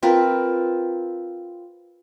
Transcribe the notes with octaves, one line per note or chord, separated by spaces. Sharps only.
C4 F4 A#4 B4